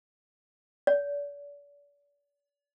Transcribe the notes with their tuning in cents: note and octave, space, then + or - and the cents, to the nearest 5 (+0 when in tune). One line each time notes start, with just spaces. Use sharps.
D5 -40